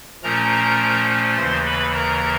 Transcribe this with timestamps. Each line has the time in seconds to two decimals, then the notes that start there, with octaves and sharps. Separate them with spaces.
0.23 A#2 F3 A3 C#4 A#4 A#5
1.37 D#2 C#3 E3 C5 C6
1.66 B4 B5
1.94 A#4 A#5